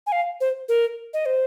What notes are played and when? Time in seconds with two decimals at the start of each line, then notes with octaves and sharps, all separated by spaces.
0.07 G#5
0.12 F5
0.41 C5
0.69 A#4
1.14 D#5
1.26 C5